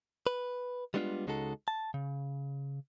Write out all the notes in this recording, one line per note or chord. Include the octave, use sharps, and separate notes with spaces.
B4
G3 G#3 B3 D4 D#4 F4
C#2 C#3 G#3 D#4 F#4 A4
A5
C#3